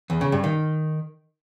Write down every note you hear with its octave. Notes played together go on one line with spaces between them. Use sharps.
E2
C#3
G2
D#3